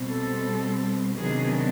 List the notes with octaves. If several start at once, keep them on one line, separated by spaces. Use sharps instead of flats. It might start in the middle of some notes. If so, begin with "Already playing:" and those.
Already playing: B2 G3 C4
A4
C3 D#3 F#3 B3 D4 G#4